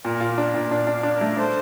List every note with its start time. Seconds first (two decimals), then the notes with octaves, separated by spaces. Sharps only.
0.05 A#2 A#4 D5
0.20 F4
0.37 D4 A#4 D5
0.54 A#2
0.70 D4 D5 F5
0.87 D4
0.92 D5 F5
1.03 D4
1.15 A#4 D5
1.21 A3
1.37 D4 A4 C5